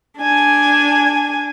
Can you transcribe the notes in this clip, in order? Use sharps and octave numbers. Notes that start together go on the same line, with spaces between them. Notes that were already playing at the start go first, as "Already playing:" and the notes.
D4 G#5